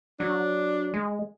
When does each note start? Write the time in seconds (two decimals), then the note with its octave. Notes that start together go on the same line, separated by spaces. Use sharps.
0.20 F#3 D4
0.94 G#3